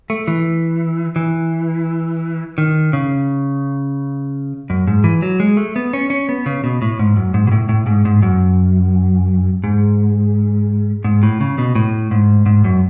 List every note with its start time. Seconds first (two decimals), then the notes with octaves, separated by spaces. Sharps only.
0.10 A3
0.27 E3
1.16 E3
2.58 D#3
2.93 C#3
4.70 F#2
4.87 G#2
5.04 E3
5.22 F#3
5.40 G#3
5.57 A3
5.76 B3
5.93 C#4
6.10 C#4
6.29 B3
6.46 C#3
6.64 B2
6.82 A2
6.99 G#2
7.16 F#2
7.34 G#2
7.47 B2
7.52 A2
7.69 A2
7.86 G#2
8.05 G#2
8.22 F#2
9.64 G#2
11.04 G#2
11.23 A2
11.41 C#3
11.58 B2
11.75 A2
12.11 G#2
12.46 G#2
12.64 F#2